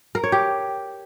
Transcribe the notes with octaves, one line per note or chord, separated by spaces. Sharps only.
A#4
C#5
G4